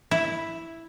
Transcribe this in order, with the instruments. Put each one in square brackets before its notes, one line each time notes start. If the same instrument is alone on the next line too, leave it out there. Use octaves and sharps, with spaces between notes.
[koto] E4